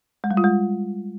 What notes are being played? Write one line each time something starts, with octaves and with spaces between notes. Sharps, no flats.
G#3
G3
F4
G#3